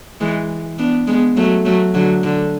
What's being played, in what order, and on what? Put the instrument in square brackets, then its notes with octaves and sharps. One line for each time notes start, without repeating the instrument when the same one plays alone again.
[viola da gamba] E3 G#3
B3 D4
G#3 B3
F#3 A3
F#3 A3
D3 F#3
D3